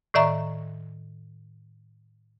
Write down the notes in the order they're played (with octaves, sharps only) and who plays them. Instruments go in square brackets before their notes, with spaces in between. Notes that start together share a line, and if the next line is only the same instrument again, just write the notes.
[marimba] A2 D#3 D5 E5 A#5 C#6